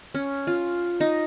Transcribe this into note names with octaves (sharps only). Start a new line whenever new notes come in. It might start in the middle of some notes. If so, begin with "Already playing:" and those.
C#4
F4
D#4